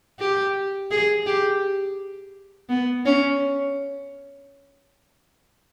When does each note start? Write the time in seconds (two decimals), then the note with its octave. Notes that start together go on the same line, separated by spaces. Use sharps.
0.19 G4
0.91 G#4
1.26 G4
2.69 B3
3.06 C#4